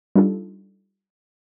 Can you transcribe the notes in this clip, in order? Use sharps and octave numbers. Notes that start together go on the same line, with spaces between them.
G3 D4 D#4 F4 A4